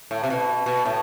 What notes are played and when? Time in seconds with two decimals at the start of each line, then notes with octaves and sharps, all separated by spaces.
0.11 A2
0.24 C3
0.30 B2
0.66 B2
0.86 A2